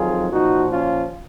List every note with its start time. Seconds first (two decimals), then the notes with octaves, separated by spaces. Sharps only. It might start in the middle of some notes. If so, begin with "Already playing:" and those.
Already playing: F2 D#3 F#3 F4 G#4
0.32 A#2 F3 D#4 F#4
0.70 C#4 F4